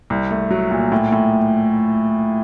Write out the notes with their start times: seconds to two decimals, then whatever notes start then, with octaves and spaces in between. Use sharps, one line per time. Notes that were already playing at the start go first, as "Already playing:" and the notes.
0.10 C2
0.31 A3
0.51 F#3
0.71 A#2
0.92 A2
1.12 A2